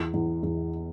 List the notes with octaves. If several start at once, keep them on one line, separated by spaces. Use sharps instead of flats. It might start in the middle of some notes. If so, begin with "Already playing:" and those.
Already playing: E2
E2
E2